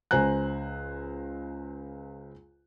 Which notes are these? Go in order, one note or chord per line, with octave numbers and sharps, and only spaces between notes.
C#2 C5 G#5 A#5 F#6